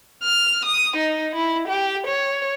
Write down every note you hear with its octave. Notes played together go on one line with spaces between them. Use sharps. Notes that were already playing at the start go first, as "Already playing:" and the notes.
F6
D#6
D#4
E4
G4
C#5